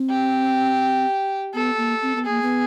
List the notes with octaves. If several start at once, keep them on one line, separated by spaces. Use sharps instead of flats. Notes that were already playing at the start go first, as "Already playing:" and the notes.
Already playing: C4
G4
B3 A4
A#3
C4
B3
A#3 G#4
B3